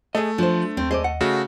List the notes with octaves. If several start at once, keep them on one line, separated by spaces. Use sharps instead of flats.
A3 G#4 D#5
F3 D4 C5
D#2 C4
G#4 C5 D5 D#5
F#5
C#3 A3 F#4